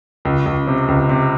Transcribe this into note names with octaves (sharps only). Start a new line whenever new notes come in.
C#2
C#2
C3
C#2
C3